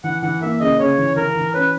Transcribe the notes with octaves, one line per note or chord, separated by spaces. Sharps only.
E3 F#5
E3 F#5
A#3 E5
C#3 D#5
C#3 C#5
E3
E3 A#4
E3
C#4 B4